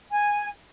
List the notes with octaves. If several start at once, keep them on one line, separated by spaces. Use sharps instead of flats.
G#5